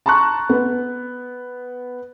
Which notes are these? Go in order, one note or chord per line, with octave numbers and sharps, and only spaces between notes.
A5 A#5 C6 C#6 F#6
B3 B4